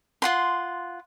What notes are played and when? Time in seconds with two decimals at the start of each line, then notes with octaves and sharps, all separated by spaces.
0.22 F4 F#5 C6